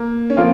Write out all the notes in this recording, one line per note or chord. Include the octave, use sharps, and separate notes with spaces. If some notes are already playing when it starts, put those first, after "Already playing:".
Already playing: A#3
C#4
F3 A#3 C4 F4